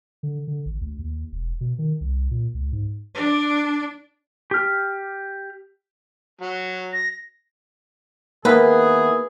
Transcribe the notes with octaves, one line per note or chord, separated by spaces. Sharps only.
D3
D3
A1
D2
D#2
E1
B2
D#3
C2
A#2
C#2
G#2
D4 D5
G4 F6
F#3
A#6
D#3 A#3 B3 E4 G#4 B4